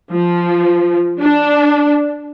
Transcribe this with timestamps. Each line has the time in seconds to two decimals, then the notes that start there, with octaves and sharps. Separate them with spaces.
0.11 F3
1.21 D4